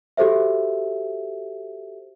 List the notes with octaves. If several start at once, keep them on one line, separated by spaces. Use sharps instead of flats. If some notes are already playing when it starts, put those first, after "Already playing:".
F#4 G4 A4 C5 E5